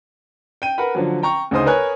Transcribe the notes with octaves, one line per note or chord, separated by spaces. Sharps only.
G5 D#7
A#4 B4 F#5 B5
D3 F3 F#3
G5 A#5 C#6
D2 C#3 D#4 C5 D#6
A#4 B4 C#5 G#5 F#6